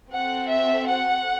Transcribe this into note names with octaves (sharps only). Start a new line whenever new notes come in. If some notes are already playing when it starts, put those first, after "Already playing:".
C4 F#4 A4 F#5
E5
F#5